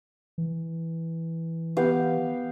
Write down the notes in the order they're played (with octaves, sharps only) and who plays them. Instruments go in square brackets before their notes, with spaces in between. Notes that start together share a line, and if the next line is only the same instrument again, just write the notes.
[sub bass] E3
[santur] B3 G4 F5